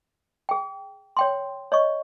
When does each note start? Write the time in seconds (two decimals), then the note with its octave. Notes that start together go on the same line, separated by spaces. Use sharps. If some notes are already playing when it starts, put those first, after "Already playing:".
0.49 G#4 G5
1.17 C#5 G5 C6
1.72 C#5 D#5 C#6